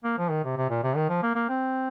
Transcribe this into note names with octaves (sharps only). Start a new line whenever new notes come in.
A#3
F3
D#3
C3
C3
A#2
C3
D#3
F3
A#3
A#3
C4